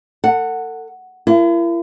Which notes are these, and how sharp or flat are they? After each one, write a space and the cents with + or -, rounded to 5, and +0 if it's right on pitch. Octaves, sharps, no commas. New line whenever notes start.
A4 +40 F#5 +0
E4 +45 A#4 +0